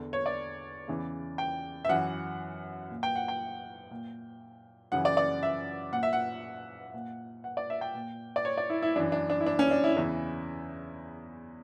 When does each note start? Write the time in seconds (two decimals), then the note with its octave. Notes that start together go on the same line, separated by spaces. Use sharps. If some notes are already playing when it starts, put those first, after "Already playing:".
Already playing: E2 D3
0.13 C#5
0.26 D5
0.88 E2 C#3 E3
1.38 G5
1.85 E5
1.89 F#2 E3 F#5
2.91 A#2
3.03 G5
3.16 F#5
3.28 G5
3.91 A#2
4.92 F#2 C#3 E3 F#5
5.05 D5
5.17 D5
5.43 E5
5.92 A#2 F#5
6.03 E5
6.13 F#5
6.94 A#2
7.44 F#5
7.57 D5
7.70 E5
7.81 G5
7.95 A#2
8.36 D5
8.45 C#5
8.58 D5
8.70 E4
8.82 E4
8.96 F#2 E3 D4
9.12 D4
9.30 D4
9.40 E4
9.46 D4
9.59 C#4
9.71 D4
9.84 E4
9.96 E2 C#3 E3